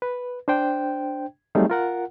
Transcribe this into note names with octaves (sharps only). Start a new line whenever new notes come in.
B4
D4 C5 G5
F#3 G3 A3 C4 D#4 G#4
F4 A#4 F#5